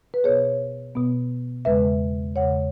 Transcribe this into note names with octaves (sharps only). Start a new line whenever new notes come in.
B4
B2 B3 G#4 C#5
B2 B3
E2 C#3 G#3 B4 E5
E2 C#3 G#3 C#5 F#5